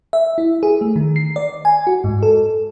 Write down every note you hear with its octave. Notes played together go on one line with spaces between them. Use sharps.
E5
E4
G#4
A3
D#3
C7
D5
G#5
F#4
G#2
A4